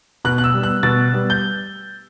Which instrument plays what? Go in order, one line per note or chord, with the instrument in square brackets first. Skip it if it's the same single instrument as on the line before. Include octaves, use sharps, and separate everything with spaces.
[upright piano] B2 F#6
F#6
E6
G3 B3
F#6
B2 A6
G3 B3
G6